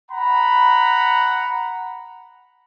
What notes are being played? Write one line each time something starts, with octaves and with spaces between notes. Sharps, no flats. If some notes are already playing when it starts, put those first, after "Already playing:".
F#5 A#5 B5